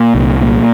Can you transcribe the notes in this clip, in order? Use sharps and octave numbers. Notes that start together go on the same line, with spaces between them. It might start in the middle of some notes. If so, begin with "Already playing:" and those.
Already playing: A#2
C2
A#2